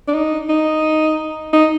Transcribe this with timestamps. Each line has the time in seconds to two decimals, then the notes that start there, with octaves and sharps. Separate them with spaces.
0.08 D4
0.14 D#4
0.49 D#4
1.53 D#4